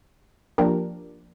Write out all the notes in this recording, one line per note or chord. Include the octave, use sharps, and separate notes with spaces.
F3 A#3 D4 G4 A#4